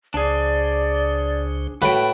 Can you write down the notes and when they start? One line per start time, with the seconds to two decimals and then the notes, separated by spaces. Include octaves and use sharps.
0.14 C#2 C#3 D4 G#4 C5 D5
1.82 A2 F#4 B4 G5 B5